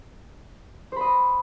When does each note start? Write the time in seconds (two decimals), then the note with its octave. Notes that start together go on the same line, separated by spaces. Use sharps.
0.92 C5
0.96 B5
1.01 D#5